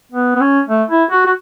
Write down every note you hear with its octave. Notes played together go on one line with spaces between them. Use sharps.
B3
B3
C#4
A3
E4
F#4
F#4